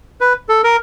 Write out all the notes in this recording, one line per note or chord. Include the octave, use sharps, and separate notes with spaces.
B4
A4
A#4